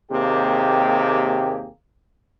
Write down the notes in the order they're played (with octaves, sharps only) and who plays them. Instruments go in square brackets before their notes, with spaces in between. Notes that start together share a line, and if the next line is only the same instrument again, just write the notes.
[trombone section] D#2 C3 A#3 G4 G#4